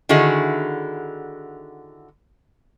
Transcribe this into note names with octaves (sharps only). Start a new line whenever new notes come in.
D3 D#3 E4 F#4 G#4